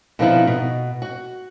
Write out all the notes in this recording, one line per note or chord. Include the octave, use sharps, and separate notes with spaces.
B2 D3 F3 C4 D#4 E4
B2
F#4